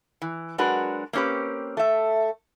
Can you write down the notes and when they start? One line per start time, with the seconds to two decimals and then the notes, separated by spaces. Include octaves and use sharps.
0.22 E3
0.58 F#3 G#3 D4 F#4 A#4 B4
1.13 A#3 C4 C#4 G4 B4
1.77 A3 E5